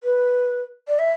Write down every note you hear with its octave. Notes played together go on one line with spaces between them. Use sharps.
B4
D5
E5